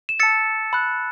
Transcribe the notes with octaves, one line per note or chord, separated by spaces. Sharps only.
E7
A5 E6 A6 C#7
B5 F#6